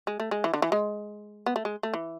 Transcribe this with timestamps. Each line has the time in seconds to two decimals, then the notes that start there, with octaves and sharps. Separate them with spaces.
0.07 G#3
0.20 A3
0.31 G#3
0.44 E3
0.54 D3
0.62 E3
0.72 G#3
1.46 B3
1.56 A3
1.65 G#3
1.83 A3
1.94 E3